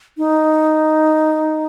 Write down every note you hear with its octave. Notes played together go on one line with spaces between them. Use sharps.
D#4